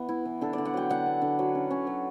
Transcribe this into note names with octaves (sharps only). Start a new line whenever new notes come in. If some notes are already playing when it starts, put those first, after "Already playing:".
Already playing: E3 B3
E4
E3
D3 A4
D5
D3
F#5
F#3 G5
D3 F#5
B3
D3
F#3
C#4
C#4
F#3